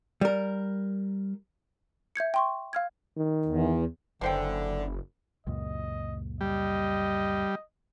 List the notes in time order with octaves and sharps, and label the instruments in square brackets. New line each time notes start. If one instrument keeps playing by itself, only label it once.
[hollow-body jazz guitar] G3 A#4
[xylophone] E5 G6 G#6 C#7
G5 C6 C#6
F5 F6 G#6
[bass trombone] D#3
[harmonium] E2
[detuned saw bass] F#1 [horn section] D3 [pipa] E3 C5 G5
[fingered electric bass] C#2 F#2 A#2 [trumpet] D#5
[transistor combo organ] G3 [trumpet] D#5